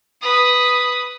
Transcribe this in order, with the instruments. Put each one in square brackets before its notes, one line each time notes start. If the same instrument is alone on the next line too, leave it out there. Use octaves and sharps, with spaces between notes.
[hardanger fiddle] B4 D#6